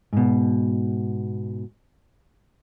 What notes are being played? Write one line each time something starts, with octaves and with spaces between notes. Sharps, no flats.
G#2 B2